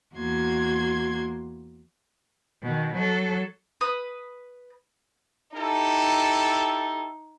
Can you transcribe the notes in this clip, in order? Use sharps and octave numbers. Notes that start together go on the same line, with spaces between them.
E2 A#3 F#4 C6 G#6
B2 D#3
F#3 A4
B4 D#6
D#4 E4 G4 A4